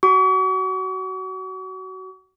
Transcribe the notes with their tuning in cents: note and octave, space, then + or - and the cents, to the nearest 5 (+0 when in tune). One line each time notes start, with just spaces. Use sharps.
F#4 +20 C#6 +45